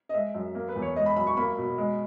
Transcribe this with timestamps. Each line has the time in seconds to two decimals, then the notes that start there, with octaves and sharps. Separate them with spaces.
0.09 D#5
0.14 G#3 E5
0.34 F#2
0.55 A#3
0.69 B4
0.76 E2
0.82 C#5
0.96 G#3 D#5
1.06 B5
1.16 F#2 B5
1.27 C#6
1.37 A#3 B5
1.58 B2
1.78 G#3